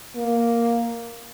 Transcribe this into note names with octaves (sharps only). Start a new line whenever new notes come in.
A#3